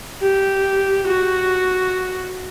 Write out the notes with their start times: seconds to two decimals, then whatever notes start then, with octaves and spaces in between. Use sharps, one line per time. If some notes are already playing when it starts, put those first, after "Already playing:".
0.22 G4
1.08 F#4